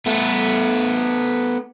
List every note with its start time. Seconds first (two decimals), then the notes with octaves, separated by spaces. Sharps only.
0.06 A3 B3